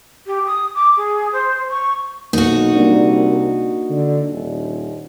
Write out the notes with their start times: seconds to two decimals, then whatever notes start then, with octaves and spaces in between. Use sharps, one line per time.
0.26 G4
0.46 D#6
0.75 D6
0.97 G#4
1.33 C5
1.69 C#6
2.33 B1 A#3 D#4 F#4
2.75 C2 A#3 D4
3.89 D3
4.30 D#1